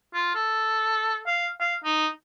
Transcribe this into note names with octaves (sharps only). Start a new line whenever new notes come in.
F4
A4
F5
F5
D#4